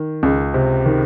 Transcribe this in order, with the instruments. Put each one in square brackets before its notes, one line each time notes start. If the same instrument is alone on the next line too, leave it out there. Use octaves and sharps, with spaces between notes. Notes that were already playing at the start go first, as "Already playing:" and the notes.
Already playing: [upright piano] D#3
C#2
C3
D#3